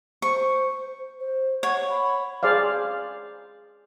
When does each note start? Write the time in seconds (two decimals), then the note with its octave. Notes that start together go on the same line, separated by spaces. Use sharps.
0.22 C5 C#6
1.19 C5
1.63 C#5 F#5
1.89 B5
2.43 G#4 C5 D5 F5